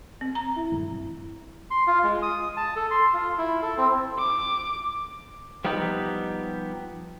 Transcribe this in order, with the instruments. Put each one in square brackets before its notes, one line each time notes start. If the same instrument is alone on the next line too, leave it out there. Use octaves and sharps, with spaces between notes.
[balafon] C4
A#5
[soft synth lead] E4
[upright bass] G2 G3
[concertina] C6
F4
G#3
D#6
A5
A4
C6
F4
E4
A4
C4
[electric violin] D6
[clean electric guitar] F3 G3 B3 D#4 G4